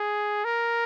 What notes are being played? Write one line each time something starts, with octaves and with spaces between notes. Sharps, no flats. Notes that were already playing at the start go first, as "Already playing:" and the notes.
Already playing: G#4
A#4